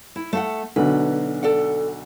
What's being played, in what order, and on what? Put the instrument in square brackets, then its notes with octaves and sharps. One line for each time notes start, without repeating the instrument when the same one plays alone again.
[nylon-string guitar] E4
A3 F5 F#5
[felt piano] B1 D3 [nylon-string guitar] B4
[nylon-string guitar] A4 D5 F#5